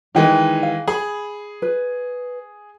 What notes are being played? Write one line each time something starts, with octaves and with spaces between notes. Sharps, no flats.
D#3 E3 G#3 D#4 G5
F5
G#4 B5
B4